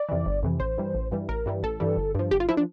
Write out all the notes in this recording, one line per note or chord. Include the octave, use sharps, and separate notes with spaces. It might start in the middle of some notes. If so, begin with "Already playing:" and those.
Already playing: D5
F2 C3 E3
G1
F2 C3 E3
A1 C5
G2 E3 G3
A1
G2 E3 G3
A1 A#4
G2 E3 G3
A1 A4
G2 E3 G3
G1
G2 F3
G1 G4
F4
F3 E4
D4